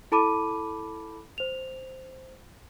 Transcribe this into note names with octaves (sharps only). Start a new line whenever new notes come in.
E4 A4 A5 B5 D6 D#7
C5 F7